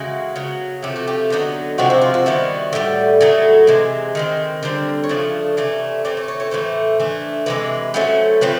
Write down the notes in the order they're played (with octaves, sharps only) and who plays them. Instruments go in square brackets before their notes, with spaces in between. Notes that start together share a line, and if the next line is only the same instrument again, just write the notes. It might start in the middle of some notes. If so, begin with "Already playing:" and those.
Already playing: [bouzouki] C#3 E3 G#3 F#4
C#3 F#3 B3
C3 F3 A3 G4
F#4
G4
D3 F#3 B3 D#4
C3 F3 G#3 C4 F#4
E4
F4
F#4
D#3 G3 B3 E4
A2 E3 G3
A2 F#3 A3 G#4
C3 E3 G#3
D#3 G#3 C4
D3 G3 C4 A#4
C#5
C#3 F3 A3 D4 D5
C3 E3 A3 C#4
E3 A3 C4 D5
C#5
C#5
C#5
A2 E3 A3 C5
E3 A3 D4
C3 E3 G#3 B4
F#3 A3 C#4 E4 C5
A2 F3 A3 C4 B4